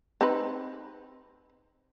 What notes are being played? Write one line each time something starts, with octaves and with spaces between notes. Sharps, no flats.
C4 D#4 B4